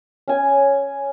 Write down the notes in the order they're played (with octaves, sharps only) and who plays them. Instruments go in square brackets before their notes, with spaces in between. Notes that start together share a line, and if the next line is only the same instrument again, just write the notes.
[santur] C#4 G#5